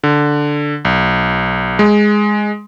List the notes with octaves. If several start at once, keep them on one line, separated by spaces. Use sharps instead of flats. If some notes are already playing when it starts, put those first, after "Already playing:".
D3
B1
G#3